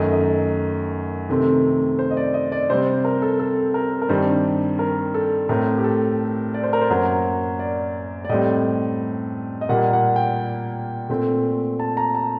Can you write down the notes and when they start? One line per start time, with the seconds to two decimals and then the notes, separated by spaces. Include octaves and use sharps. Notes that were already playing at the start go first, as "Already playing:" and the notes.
Already playing: F#2 D#3 A3 D#5
0.12 D#5
1.29 C3 D#3 A3 C4
1.99 C5
2.11 D#5
2.17 D5
2.34 D#5
2.52 D5
2.70 C3 G3 C4 C5
3.05 A#4
3.22 A4
3.39 A4
3.74 A#4
4.02 A#4
4.09 G2 D#3 G3 C4 C5
4.79 A#4
5.14 A4
5.49 A2 A3 C4 A#4
5.78 G4
5.84 A4
6.54 D5
6.63 C5
6.73 A#4
6.82 C5
6.90 F#2 F#3 A#3
7.59 D5
8.25 D5
8.29 A2 G3 C4 D#5
9.61 D#5
9.69 A#2 G3 A#3 F#5
9.93 F#5
10.16 G5
11.10 A#2 A3 C4
11.80 A5
11.97 A#5
12.15 A5